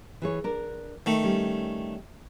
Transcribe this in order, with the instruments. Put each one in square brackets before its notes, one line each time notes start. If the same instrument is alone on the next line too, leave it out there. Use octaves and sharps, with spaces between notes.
[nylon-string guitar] E3 G#4 C#5
D4 A#4
[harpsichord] D#3 A3
[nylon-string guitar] G3 C#4